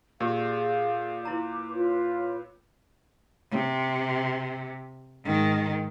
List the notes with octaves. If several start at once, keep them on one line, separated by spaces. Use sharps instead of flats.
A#2 G4 G#4 D5 F5
E4 B4 A#5 D6
F4 B4 C#5
C3
G#2 D#3